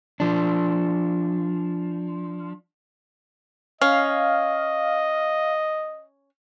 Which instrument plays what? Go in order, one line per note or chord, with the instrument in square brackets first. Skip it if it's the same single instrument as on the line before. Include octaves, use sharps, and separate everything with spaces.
[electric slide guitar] F3 D4
[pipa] C#4 [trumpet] D#5 [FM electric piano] F5